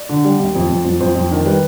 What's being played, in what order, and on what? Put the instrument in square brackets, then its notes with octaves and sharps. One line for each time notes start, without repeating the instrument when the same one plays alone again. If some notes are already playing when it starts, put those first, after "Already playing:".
Already playing: [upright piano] D5
D3
G3
D#2
F2
F2
F2
F2 C5
F2
D#3
G3 B4